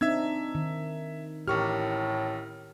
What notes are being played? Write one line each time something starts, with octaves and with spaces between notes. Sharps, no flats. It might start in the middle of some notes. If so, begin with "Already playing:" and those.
C4 D4 D#4 E5 E6 G#6
D#3
A1 A2 G4 A#4 C#6 F6